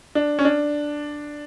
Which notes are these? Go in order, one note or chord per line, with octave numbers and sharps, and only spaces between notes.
D4
C#4
D4